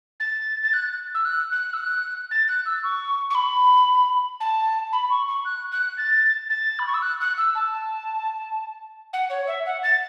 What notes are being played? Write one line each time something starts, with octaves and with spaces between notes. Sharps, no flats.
A6
A6
F#6
E6
F#6
F#6
E6
F#6
A6
F#6
E6
C#6
C#6
B5
A5
B5
C#6
C#6
F#6
F#6
A6
A6
B5
C#6
E6
F#6
F#6
E6
A5
F#5
C#5
E5
F#5
A6